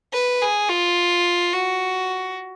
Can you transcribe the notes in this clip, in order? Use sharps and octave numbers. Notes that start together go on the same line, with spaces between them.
B4
G#4
F4
F#4